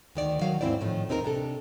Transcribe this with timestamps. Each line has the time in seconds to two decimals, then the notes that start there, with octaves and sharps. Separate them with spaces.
0.15 D2 D#3 D5
0.41 D#3 F#3 F5
0.61 D#2 G#2 C4 E4 C5 D5
0.81 A2 D#3 F3
1.09 D#2 C4 D#4 A4 A#4
1.24 C3 D4 A4